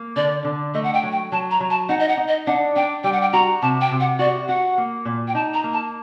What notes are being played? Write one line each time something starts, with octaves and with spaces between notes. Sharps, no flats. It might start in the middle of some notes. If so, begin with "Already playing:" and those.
Already playing: A#3
D3 D5
D3
A3 D#5
F#5
G5
F#3
G5
F#3 A5
A#5
F#3
A5
D#4 F#5
D#5
F#5
D#4
D#5
D4 F#5
D4 G5
G3 G5
F#5
G5
F#4 A#5
C3 A5
G5
C3
F#5
F#4 D5
F#4 F#5
A#3
A#2
G5
D#4 A5
A#5
A#3
A5